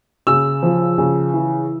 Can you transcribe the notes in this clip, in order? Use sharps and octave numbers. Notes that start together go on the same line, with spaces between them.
C#3 E6
F3
C#3
E3